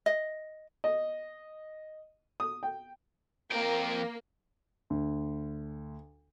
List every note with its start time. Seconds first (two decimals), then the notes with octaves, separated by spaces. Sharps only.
0.06 D#5
0.84 D#5
2.40 D#6
2.63 G5
3.52 F2 A#3 G5
4.90 D2